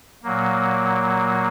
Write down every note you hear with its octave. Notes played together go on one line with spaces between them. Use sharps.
A#2 F#3 A#3